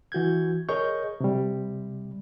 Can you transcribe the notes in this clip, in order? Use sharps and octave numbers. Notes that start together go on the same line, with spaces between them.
E3 F#4 G6 G#6
G#4 A#4 C#5 D#5 C#6 G6
C3 G3